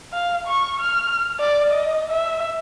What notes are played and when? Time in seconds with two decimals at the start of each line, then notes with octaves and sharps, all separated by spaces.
0.13 F5
0.47 C#6
0.80 F6
1.39 D5
1.70 D#5
2.10 E5